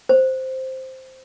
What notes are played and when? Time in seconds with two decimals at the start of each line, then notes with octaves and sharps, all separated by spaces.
0.09 C5